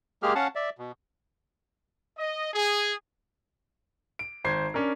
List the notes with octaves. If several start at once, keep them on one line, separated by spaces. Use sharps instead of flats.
G#3 A#3 G4 G#4 F6
C#4 F5 F#5 A5
D5 E5
B2
D#5
G#4
D7
G#1 C5 G#6 C7
C#4 D4 A#4